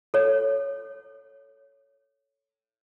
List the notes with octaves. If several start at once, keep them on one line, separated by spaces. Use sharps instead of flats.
A4 C#5